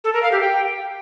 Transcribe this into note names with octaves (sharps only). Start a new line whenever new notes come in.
A4
A#4
F5
G4
G5